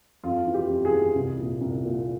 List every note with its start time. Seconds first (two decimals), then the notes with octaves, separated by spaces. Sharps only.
0.24 F2 F4
0.47 E3
0.54 G4
0.70 F2
0.85 G#4
0.92 E3
1.15 C2
1.39 A#2
1.61 C2
1.84 A#2